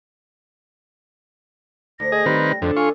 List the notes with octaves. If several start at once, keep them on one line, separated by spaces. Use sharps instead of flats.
D2 A#6
G#4 D#5
D#3 G3 C4 B4
F2 D3 D4
F4 G#5 C#6